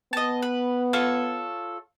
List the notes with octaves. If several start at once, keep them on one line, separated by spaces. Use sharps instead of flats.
B3 D#5 A5
B4
F4 A4 C#5